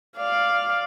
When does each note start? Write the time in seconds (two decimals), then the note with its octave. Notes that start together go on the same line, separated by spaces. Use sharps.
0.18 D5 F5